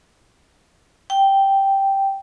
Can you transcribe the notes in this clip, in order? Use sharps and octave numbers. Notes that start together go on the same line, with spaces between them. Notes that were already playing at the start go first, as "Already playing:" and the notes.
G5